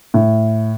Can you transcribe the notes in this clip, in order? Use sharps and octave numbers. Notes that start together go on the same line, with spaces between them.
A2